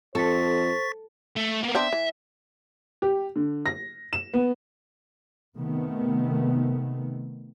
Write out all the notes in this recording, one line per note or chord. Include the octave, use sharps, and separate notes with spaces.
F2 A4 C5 C#6 A6 B6
A3
A#3 B3
B3 C4 D4 E5
E3
G4
D3
A#6
E7
B3
C3 D#3 A3 B3